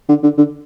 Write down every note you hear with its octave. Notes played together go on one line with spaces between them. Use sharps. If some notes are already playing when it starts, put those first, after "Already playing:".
D3
D3
D3